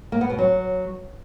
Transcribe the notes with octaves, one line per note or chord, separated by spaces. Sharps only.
A#3
B3
B2
F#3